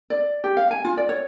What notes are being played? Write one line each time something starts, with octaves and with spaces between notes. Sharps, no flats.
D5
G4
F5
G#5
F4
D5
C#5